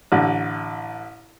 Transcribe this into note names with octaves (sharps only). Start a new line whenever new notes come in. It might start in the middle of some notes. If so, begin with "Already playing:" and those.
A1 D3